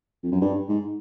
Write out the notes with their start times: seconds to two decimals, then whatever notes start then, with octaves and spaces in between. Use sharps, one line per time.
0.23 F2
0.32 F#2
0.42 G2
0.69 G#2